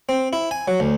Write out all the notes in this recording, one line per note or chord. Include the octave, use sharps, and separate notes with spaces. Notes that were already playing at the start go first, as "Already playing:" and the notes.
C4
E4
G#5
F#3
D2